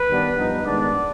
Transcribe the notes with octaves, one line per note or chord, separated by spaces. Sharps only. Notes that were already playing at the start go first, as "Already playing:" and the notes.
Already playing: B4
D#3 G3 B3 D4
G2 F3 B3 D#4
G#2 D#3 B3 D4 D5